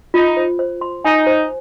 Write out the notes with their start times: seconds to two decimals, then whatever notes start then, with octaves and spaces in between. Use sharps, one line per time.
0.14 D#4 F4
0.37 C5
0.59 C5
0.81 C6
1.04 D#4 G#5
1.27 C5